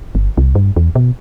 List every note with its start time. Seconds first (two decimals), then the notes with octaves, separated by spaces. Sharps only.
0.15 G1
0.38 C2
0.55 G2
0.76 E2
0.95 B2